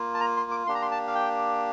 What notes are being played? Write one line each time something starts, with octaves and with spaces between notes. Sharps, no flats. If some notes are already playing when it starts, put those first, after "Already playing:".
Already playing: A#3 F4
A5
A#5
C6
D6
A#3 D4 G4 C6
A#5
C6
A5
F5
G5